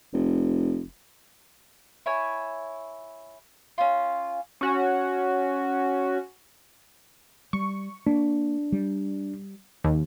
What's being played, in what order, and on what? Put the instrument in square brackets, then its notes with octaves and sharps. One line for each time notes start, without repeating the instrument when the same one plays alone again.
[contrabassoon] F1
[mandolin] E4 C#5 G#5
C#4 F4
[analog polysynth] C#4 F#4
[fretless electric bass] G3 [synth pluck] C#6
[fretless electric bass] A#3 [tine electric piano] D4
[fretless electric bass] G3
[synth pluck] D#2